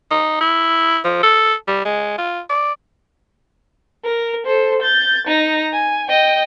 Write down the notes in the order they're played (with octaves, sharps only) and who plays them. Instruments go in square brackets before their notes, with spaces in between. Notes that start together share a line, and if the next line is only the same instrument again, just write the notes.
[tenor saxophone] D#4
E4
F3
A4
G3
G#3
F4
D5
[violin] A#4
A4 C5
G6 A6
D#4 A#5
G#5
D#5 G5